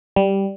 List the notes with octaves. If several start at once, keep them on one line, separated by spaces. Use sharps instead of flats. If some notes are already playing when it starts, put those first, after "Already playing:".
G3